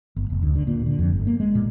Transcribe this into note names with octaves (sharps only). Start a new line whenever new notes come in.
G1
F1
D2
D3
A#2
D3
F2
G1
A#3
G#3
A#2